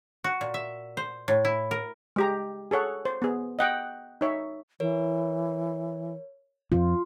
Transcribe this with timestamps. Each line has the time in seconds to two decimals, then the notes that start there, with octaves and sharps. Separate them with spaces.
0.24 F#4
0.41 A#2
0.54 E5
0.97 C5
1.28 A2
1.45 E4
1.71 A#4
2.16 G#3 G4 A#5
2.71 G#4 A4 C#5 F#5
3.05 C5
3.22 B3 G#4
3.59 D#5 F#5 G5
4.21 D#4 C#5 E5
4.80 E3 A#4 C#5
6.72 F2 F3 F4